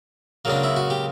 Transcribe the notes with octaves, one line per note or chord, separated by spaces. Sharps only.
C#2 C#3 F#3 A#3 D4
E4
F#4
G4